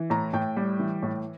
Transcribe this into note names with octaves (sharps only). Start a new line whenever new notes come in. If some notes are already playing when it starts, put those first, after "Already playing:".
Already playing: E3
A2 A#5
A2 G5
G3
E3
A2